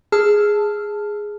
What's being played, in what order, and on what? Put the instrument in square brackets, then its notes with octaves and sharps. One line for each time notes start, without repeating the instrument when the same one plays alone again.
[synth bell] G#4 A5 E6 F6